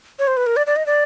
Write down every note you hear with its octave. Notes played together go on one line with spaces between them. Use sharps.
C#5
C5
B4
A#4
D5
D5
D#5
D5